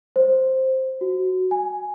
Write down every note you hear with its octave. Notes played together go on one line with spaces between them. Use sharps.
C5
F#4
G#5